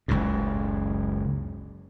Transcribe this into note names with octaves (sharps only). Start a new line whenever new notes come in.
F#1 C#2 F#2 A2